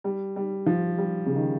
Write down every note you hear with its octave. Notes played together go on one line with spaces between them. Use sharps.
G3
G3
F3
G3
C#3
D#3